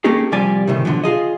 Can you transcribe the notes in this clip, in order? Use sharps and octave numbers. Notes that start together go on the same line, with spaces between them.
A3 A#3 C#4 D#4 G4 G#4
C2 F3 G3 D5 G#5
C#2 A2 C3 D#3
B2 D3 F3 F#3
F4 G#4 D#5